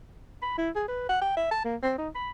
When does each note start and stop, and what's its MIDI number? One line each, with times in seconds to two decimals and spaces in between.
0.42 0.56 83
0.58 0.70 64
0.75 0.84 68
0.88 1.08 71
1.09 1.19 78
1.21 1.33 79
1.37 1.50 76
1.51 1.62 81
1.64 1.76 58
1.83 1.94 60
1.98 2.09 63
2.15 2.31 83